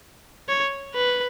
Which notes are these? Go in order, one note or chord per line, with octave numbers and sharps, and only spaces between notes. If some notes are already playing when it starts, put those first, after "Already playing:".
C#5
B4